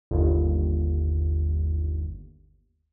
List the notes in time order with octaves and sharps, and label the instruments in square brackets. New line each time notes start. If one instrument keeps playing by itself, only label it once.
[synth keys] G1 D#2